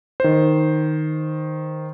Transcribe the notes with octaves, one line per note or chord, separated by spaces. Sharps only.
D#3 C5